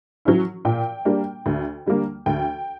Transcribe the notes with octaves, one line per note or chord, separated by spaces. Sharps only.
F#3 C#4 E4
A#2 G5
G3 A#3 D4
D2
D3 G3 A#3
D2 G5